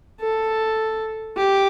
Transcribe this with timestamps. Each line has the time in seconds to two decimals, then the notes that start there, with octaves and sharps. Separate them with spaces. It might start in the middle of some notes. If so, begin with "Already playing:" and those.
0.20 A4
1.37 G4